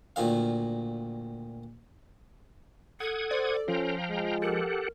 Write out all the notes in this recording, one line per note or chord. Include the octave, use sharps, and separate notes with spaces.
D2 A#2 D#3 F5
A4 F#5 D#6 G#6
C5 D5
F3 C#4 F5 G5 A#5
G#3
G4 A4 A#4 F#5